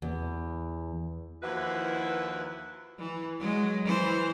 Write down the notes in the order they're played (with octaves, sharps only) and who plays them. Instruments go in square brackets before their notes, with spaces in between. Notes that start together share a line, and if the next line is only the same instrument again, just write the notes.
[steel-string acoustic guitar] E2
[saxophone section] D#2 E3 F3 E4 F#4 B4
[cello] E3
F#3 G#3
E3 C5